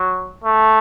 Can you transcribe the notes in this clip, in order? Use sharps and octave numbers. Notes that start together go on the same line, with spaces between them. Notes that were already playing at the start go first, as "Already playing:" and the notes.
Already playing: F#3
A3